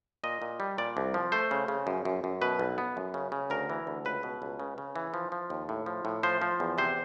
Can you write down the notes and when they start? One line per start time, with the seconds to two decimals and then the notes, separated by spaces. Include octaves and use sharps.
0.24 A#2 D#5
0.42 A#2
0.60 G3
0.78 A#2 D5
0.97 C2
1.14 F3
1.32 A3 C5
1.51 C#3
1.68 C#3
1.87 F#2
2.05 F#2
2.24 F#2
2.41 B2 B4
2.59 B1
2.78 B3
2.97 F#2
3.14 C#3
3.32 C#3
3.50 D2 A#4
3.69 E3
3.87 D2
4.05 C#2 B4
4.23 B2
4.42 C#2
4.60 C#3
4.78 C#3
4.96 E3
5.14 F3
5.32 F3
5.50 D#2
5.69 A2
5.86 F3
6.05 A2
6.23 F3 C5
6.42 F3
6.60 E2
6.78 C3 C5